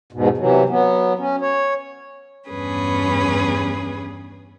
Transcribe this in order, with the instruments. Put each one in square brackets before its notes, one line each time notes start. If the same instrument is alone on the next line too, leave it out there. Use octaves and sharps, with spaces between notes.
[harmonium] E2 G#2 B2
C3 E3 F#3
F#3 B3
C#4
C#5
[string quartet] E2 G2 C#4 G#4 B4